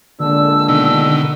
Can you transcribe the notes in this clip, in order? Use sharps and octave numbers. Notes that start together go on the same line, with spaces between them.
A#2 D3 G#3 D4 E6
B2 D#3